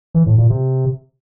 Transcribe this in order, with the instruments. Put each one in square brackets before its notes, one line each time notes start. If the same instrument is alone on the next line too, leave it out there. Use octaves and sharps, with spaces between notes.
[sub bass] E3
A2
A#2
C3